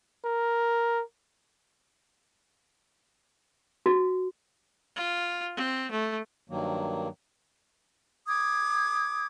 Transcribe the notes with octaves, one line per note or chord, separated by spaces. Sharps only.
A#4
F#4
F4
C4
A3
G2 D#3 F#3 A#3
D6 D#6 G#6